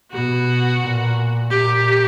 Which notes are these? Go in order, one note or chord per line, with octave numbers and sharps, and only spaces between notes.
B2 F#4
A#2
A#2 G4